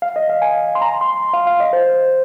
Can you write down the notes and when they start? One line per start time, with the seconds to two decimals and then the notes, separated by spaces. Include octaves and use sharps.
0.02 F5
0.16 D#5
0.29 F5
0.42 G#5
0.75 C6
0.82 A#5
1.01 C6
1.33 F5
1.47 F5
1.60 D#5
1.73 C5